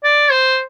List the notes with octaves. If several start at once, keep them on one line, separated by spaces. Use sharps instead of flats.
D5
C5